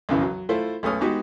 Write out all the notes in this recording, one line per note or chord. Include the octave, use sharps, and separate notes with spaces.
B1 F#2 C#3 E3
F#3
A3 E4 F4 A4 C5
B1 A3 C#4 D#6 F6
G#3 B3 D#4 F#4 G4